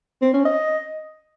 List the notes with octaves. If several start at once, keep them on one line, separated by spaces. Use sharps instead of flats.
C4
C#4
D#5